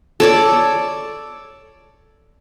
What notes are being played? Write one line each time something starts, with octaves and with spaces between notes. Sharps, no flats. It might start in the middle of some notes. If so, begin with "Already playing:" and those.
A4 C#5 D5